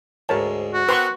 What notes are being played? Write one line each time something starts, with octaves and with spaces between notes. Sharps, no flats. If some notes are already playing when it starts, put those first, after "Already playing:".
D2 G#2 A#4 C#5 A5
F#4
B3 C4 A#4 B4 C6 C#6